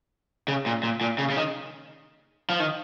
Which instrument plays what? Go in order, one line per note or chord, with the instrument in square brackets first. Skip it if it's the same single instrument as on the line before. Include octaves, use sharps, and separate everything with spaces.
[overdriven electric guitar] C#3
A#2
A#2
A#2
C#3
C#3
D#3
F3
D#3